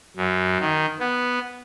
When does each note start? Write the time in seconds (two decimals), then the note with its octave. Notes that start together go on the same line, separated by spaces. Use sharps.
0.17 F#2
0.60 D#3
1.00 B3